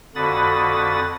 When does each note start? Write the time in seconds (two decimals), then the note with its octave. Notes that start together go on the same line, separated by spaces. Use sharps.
0.15 F2 D3 F#4 B5 D#6 A6